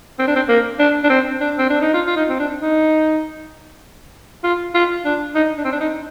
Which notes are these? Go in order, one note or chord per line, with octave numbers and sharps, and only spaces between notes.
C4
D4
C4
A#3
D4
D4
C4
D4
C4
D4
D#4
F4
F4
D#4
C4
D4
D#4
F4
F4
D4
D#4
D4
C4
D4
D#4